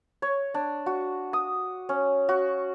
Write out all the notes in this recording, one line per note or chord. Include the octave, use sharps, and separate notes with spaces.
C#5
D4
F#4
D#6
C#4
F#4